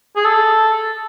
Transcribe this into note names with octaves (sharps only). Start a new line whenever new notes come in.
G#4
A4